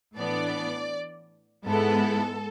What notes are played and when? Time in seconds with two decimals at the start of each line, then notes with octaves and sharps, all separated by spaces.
0.16 A2 E3 B3 D4 D5
1.66 G#2 G#3 B3 E4 A4